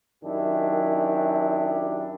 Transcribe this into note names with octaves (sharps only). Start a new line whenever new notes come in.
F#2 D#3 D4 E4 G4